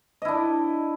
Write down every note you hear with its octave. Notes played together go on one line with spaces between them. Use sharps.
D4 E4 D#5